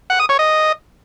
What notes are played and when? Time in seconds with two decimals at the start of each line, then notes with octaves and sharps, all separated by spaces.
0.10 F#5
0.20 D#6
0.29 C#5
0.39 D#5